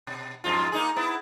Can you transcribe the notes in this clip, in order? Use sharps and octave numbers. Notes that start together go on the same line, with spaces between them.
B2
F2 G#2 F4
A#3 D#4 G#4
B3 E4